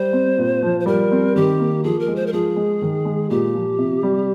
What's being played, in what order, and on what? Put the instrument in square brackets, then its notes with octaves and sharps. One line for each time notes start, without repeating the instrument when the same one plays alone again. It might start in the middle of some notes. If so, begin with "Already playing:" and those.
Already playing: [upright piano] G3 [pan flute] C5
[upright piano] C4
A#2
F3
[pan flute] C5
[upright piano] G3 [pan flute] A#4
[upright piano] C4
[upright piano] D#3 [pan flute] G4
[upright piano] A#3
[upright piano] F3 [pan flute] G#4
[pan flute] A#4
[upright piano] G#3
[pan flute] C5
A#4
[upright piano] F3 [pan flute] G#4
[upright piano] G#3
D#3
G#3
[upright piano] A#2 [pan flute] G4
[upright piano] F3
C3
G3